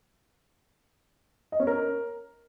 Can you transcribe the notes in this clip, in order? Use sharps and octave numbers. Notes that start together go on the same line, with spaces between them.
D#5
C#4
A#4